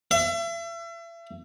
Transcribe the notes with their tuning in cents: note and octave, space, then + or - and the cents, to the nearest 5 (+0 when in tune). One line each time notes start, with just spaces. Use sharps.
E5 +35